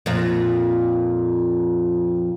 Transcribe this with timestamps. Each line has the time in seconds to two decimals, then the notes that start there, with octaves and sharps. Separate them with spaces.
0.06 F2 A#2